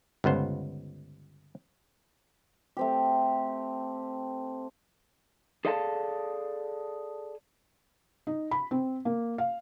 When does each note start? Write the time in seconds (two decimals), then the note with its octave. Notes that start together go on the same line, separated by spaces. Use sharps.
0.24 G1 C#2 B3 C5
2.77 A3 C4 G4
5.65 G#4 A4 D5 F5 G#5 A5
8.27 D#4
8.51 B5
8.71 C4
9.05 A#3
9.38 F5